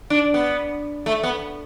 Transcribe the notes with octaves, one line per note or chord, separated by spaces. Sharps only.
D4
B3
A3
B3